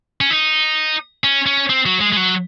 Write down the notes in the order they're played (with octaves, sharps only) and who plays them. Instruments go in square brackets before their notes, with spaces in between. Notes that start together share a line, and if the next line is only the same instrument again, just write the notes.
[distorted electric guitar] C#4
D#4
C#4
C#4
C4
F#3
G#3
G#3
F#3